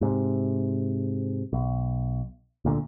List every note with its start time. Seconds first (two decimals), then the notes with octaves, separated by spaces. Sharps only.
0.01 G#2 C3
1.53 B1
2.65 D2 A#2 D3